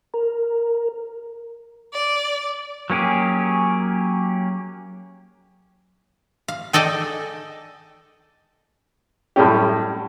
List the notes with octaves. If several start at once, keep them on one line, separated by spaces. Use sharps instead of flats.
A#4
D5
F#3 A#3 C#4 G4 G#4
F5
G#4 A4 D5 D#5 G5
F#2 A2 G3 C#4 G4